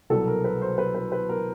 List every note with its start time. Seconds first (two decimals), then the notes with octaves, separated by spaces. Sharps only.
0.10 C2 B2 F#3 B3 A4
0.27 A#4
0.44 B4
0.62 C5
0.78 B4
0.95 B4
1.12 B4
1.29 A#4